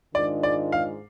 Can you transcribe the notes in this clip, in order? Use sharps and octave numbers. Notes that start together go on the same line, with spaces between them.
G#2 D#3 G#3 D4 F4 D5
D5
F5